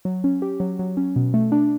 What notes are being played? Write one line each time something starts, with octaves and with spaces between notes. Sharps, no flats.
F#3
C#4
G4
F#3
F#3
C#4
B2
A3
D4